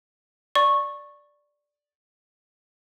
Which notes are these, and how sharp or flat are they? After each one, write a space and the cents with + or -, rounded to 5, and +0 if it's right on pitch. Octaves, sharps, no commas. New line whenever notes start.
D5 +0 C#6 -10